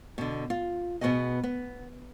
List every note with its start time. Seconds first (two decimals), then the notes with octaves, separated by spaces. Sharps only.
0.18 B2 D3
0.50 F4
1.01 B2 B3 C4 F#4 G#4 D#5
1.43 B3